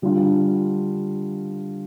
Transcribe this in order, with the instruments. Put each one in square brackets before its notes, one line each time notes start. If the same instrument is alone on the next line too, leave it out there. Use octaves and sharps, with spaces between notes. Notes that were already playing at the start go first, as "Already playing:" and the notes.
[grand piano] D3 G3 D4 F4